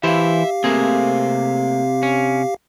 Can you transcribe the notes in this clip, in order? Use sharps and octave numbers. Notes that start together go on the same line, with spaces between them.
E3 E4 G4 C5 E5 F5
C3 A3 A#3 C4 G#4
C#4